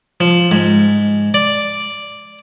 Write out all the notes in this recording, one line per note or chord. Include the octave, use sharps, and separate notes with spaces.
F3
G#2
D5